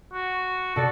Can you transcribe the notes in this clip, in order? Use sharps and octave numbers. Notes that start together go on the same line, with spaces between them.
F#4
B2 A4 D5 A6